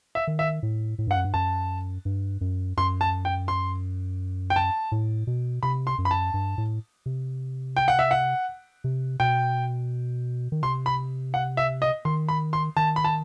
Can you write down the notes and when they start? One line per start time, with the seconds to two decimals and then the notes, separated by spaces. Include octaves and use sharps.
0.15 E5
0.27 D#3
0.39 E5
0.63 A2
0.98 A2
1.07 G2 F#5
1.16 F#2
1.24 G2
1.34 F#2 A5
2.05 G2
2.41 F#2
2.77 F#2 C6
3.01 A5
3.25 G5
3.48 C6
4.50 G5
4.56 A5
4.92 A2
5.27 B2
5.63 C3 B5
5.87 C6
5.98 F#2
6.05 B5
6.11 A5
6.34 G2
6.58 A2
7.06 C3
7.77 G5
7.88 F#5
7.99 E5
8.11 F#5
8.84 C3
9.20 B2 G5
10.52 D#3
10.63 C3 C6
10.86 B5
11.34 F#5
11.57 E5
11.82 D#5
12.05 D#3 C6
12.29 B5
12.53 C6
12.76 D#3 A5
12.96 B5
13.04 A5